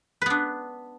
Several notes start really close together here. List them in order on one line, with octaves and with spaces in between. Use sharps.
B4 B3 D4